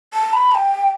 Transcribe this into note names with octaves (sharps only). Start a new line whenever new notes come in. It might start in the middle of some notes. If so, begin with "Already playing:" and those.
A5
B5
A5
G5